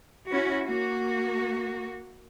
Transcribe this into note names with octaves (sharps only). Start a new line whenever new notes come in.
C#4 E4 F#4
A#3 F#4